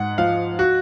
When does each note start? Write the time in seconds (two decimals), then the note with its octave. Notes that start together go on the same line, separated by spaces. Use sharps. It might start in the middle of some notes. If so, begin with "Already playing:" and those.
Already playing: G#2 F#5
0.18 F3 F5
0.59 F#4